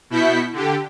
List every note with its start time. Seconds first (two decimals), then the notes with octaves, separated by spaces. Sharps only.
0.10 B2 E4 G6 B6 C#7
0.53 D3 G4